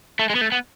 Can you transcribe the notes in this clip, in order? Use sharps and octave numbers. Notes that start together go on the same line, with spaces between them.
A3
G#3
B3
A3
B3